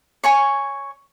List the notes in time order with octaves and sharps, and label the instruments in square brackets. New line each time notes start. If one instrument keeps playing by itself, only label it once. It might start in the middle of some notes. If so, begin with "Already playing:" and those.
[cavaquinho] C#5 G#5 C#6